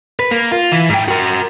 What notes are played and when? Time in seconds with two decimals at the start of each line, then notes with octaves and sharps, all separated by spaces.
0.19 B4
0.31 A#3
0.52 F4
0.72 E3
0.90 G#2 G5
1.08 F#4 A#4